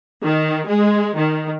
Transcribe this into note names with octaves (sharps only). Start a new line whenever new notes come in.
D#3
G#3
D#3